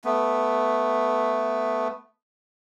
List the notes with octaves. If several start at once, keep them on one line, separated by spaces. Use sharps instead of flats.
A3 B3